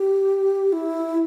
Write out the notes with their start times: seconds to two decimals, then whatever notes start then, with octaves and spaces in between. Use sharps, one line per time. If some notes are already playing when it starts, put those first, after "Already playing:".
Already playing: G4
0.73 E4